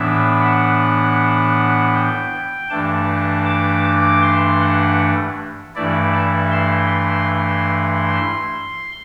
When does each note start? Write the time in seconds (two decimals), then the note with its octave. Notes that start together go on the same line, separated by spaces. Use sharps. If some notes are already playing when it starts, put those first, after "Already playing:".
Already playing: A2 E3 B3 D4 E5
0.41 F#5
1.94 G5
2.69 G2 E3 A3 D4 A5
3.46 D6
3.84 D6
4.22 C6
4.60 F#5
5.75 G2 E3 A3 E4 D5
6.13 A5
6.51 C6
6.89 C6